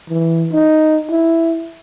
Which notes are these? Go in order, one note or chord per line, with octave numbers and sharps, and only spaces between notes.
E3
D#4
E4